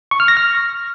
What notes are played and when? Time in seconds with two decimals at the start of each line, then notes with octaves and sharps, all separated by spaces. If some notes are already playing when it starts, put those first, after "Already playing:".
0.11 C#6
0.20 F6
0.28 A#6
0.37 F6